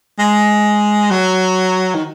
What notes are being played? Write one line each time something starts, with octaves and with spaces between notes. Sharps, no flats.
G#3
F#3
D#3